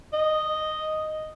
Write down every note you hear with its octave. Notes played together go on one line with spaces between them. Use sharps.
D#5